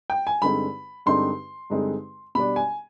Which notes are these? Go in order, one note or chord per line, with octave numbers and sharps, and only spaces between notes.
G5
G#5
G2 D3 G#3 C4 D#4 B5
G2 D3 G#3 C4 D#4 C6
G2 D3 G#3 C4 D#4
B2 G3 D4 B5
G#5